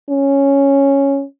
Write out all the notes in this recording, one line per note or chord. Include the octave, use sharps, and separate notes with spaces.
C#4